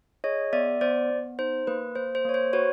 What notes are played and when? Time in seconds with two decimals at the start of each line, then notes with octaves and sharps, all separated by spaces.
0.24 G#4 C#5 D#5
0.53 B3 D5 E5
0.81 B3 C5 D5
1.10 B3
1.39 D#4 C5
1.67 A#3 B4
1.95 A#3 C5
2.15 C5
2.25 A#3 C#5
2.34 C5
2.53 F#4 B4 C#5